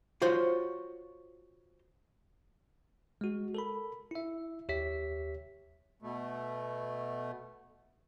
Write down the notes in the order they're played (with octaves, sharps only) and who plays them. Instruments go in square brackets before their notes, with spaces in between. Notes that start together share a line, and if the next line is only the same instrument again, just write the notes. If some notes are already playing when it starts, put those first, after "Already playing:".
[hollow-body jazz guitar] F4 F#4 C5 C#5
[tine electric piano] G#3 F#4
A4 A#4 B5
E4 E5
D#2 G4 C#5 E5 B6
[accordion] B2 A3